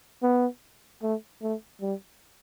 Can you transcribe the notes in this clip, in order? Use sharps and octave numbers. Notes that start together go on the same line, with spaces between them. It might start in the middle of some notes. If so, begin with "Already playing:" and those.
B3
A3
A3
G3